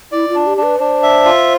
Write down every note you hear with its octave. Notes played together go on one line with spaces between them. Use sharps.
E4 D5
F4
D4
G4
D4
B4
D4 C5
E5
F4